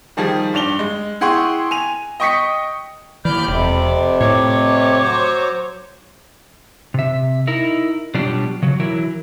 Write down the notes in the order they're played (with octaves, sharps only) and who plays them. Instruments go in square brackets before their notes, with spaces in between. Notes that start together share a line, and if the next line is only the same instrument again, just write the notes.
[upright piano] D#3 F3 G3 G#4
G2 D5 F7 G7
G#3
E4 G#4 F#5 G5 C6 C#6
G#5 D#7 F7
D#5 G5 C#6 D#6 B6 C#7
[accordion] D#2 F6 G6 [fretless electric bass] E3 [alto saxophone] D5 [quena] B5
[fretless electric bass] E1 [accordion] F2 C3
[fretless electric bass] A2 [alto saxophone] C#5 [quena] D6
[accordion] F#3 C5
[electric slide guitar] C3 E5
D#4 E4 A#4
B2 F#3 G3 D4 F4 G4
C#3 F#3
E3 F#3 E4 A#4